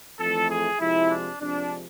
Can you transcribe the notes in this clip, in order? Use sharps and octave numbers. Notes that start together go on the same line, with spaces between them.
F2 E3 A3 A4
G#4
F2 C3 F3 G#3 E4
D4
F2 C3 F3 G#3 D4